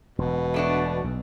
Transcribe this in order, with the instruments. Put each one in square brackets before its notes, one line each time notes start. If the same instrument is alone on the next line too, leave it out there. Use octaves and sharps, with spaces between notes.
[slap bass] E1 [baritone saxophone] B2
[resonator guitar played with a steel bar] A3 D4 F#4
[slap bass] B1